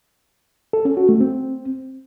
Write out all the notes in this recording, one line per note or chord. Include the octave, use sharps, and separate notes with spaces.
A4
C#4
F#4
A3
C4